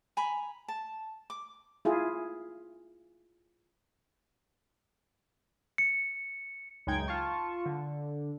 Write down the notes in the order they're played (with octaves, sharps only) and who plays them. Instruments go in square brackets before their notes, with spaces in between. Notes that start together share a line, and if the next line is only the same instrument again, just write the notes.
[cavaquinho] G#5 A#5 B5
A5
D6
[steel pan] E4 F4 G#4
[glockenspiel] C#7
[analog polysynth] C#2 F#2 G#3 D#4 G5 G#6
F4 A5 C#6
D3